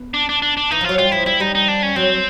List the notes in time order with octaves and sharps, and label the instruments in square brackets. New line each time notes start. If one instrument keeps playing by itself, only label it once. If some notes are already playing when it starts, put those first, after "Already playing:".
Already playing: [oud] B3
[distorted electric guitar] D4
D4
D4
D4
[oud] E3 [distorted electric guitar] D#4
[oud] F3
[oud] F#3 [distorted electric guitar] F4
[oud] G3 [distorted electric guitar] F4
[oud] F3 [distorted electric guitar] E4
[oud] G3 [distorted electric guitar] E4
[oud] G3 [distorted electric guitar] D#4
[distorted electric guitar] D#4
D4
C#4
[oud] F#3 [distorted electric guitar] C4